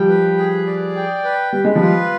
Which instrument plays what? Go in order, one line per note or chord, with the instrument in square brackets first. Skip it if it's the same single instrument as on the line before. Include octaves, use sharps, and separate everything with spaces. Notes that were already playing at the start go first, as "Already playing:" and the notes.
Already playing: [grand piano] F3 G3 [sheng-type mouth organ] G5
[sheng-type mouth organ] B4
G#4
D5
G5
B4
[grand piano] G3 [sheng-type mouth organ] B4
[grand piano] G#3
F3 G3
[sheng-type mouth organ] F4